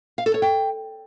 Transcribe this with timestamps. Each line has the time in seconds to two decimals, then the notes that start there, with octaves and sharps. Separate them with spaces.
0.18 F5
0.26 A4
0.34 C#5
0.42 G5